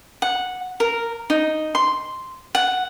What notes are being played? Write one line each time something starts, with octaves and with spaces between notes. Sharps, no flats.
F#5
A#4
D#4
C6
F#5